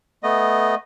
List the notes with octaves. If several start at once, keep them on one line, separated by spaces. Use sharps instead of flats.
A3 B3 D#5